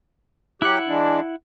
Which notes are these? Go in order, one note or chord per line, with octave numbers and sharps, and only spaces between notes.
F#3 E4 G4 F#5 F#6
E3 G#3 D4